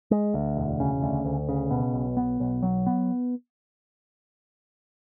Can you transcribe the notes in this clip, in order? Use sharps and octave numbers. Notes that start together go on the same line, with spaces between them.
G#3
D2
E1
C#3
D2
D2
C#3
B2
B1
B3
B1
F#3
B3